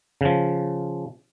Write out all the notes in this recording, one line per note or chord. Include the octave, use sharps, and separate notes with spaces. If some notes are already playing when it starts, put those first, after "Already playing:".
C#3 F3